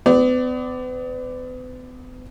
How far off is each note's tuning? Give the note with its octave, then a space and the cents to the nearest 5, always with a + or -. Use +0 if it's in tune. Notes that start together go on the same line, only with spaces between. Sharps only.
B3 +40 D5 +0